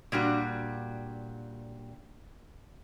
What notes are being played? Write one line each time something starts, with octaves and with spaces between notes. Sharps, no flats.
A#2 G3 D4 F#4